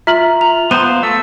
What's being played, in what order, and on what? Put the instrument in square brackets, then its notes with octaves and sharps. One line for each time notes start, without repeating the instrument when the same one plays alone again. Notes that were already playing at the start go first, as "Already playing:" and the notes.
[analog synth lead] F4 [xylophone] E5 [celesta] A#5 F6 F#7
[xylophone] A#5 [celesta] F7
[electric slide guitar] B3 C5 [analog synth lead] C6 [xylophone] D#7
[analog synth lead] F5
[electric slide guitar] A3 [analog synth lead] E6